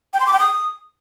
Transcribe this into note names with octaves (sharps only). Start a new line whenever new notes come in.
G5
C6
D6
G5
D#6